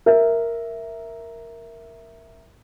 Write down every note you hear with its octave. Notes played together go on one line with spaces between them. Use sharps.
A#4 E5